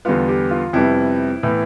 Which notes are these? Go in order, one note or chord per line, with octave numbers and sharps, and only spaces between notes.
E2 D3 G3 B3 F4
G4
F4
F2 C3 G3 B3 E4
A2 E3 B3